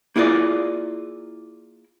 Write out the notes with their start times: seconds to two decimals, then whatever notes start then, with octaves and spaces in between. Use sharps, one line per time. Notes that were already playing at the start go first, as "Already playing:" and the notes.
0.16 A#3 E4 F4 G#4 D5